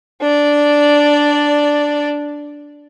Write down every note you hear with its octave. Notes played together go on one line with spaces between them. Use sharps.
D4 D5